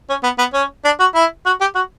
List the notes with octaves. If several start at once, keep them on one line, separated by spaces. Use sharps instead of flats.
C#4
B3
B3
C#4
D4
F#4
E4
F#4
G4
F#4